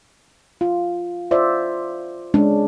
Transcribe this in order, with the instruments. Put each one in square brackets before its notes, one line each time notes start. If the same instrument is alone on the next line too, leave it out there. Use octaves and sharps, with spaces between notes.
[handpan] F4
F4 C5 D5 E5
G#3 C#4 D4